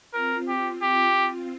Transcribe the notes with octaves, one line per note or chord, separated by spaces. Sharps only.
C4 F4 A#4
C4 F4 G4
G4
C4 F4